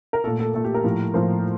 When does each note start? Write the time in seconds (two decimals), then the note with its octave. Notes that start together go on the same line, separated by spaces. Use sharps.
0.13 A#4
0.24 A#2 A3 A4
0.39 A4
0.54 A#2 A3 A4
0.64 G4
0.74 A#4
0.84 A2 F3 A#3
1.14 A2 F3 A#3 C5